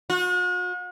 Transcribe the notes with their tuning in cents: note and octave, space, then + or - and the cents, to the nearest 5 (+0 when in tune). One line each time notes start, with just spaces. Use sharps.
F#4 -45